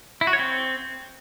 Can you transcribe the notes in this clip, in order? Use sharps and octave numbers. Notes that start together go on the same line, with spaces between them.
E4
F#4
C#5
C4